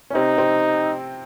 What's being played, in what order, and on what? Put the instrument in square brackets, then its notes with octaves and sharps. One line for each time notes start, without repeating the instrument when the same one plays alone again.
[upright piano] C#4
[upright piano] C3 C4 [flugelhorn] D#4
[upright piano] C3 C4